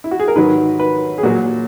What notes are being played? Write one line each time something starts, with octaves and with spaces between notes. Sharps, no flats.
E4
F#4
G#4
A#4
G#2 D#3 F#3 B4
B4
G#4
A#2 F#3 F#4